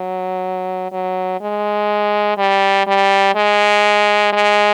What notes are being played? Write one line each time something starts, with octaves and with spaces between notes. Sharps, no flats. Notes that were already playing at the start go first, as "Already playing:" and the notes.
Already playing: F#3
F#3
G#3
G3
G3
G#3
G#3